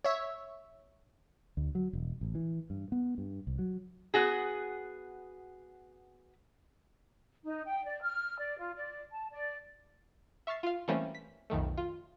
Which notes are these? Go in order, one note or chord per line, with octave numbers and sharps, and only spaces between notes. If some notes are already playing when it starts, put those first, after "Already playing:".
C#5 E5
D2
F#3
E1
A1
E3
G2
B3
G2
C2
F#3
B3 F#4 G#4
D#4
G5
D5
F6
D5
F4
D5
A5
D5
E5 C#6 F6 A6 C7
F4 F5
E3 G3 A3 A#3 C4 C#4
B6
B1 F2 D#3 A3
F4